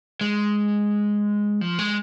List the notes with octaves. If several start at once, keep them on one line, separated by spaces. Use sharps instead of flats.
G#3
F3
G#3